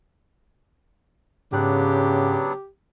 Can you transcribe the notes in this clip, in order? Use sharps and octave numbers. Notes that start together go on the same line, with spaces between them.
G#2 C#3 F#3 B3 D4 G4 G5 F#6